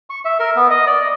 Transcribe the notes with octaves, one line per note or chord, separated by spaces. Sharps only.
C#6
E5
A#4
B3
D#5
D5
D#5